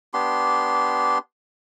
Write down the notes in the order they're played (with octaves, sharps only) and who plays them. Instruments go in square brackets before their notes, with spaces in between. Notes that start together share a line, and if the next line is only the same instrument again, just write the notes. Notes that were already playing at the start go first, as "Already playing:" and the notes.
[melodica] B3 D4 G4 C6